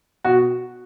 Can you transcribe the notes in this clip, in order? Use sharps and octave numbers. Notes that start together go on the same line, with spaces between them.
B2 F#4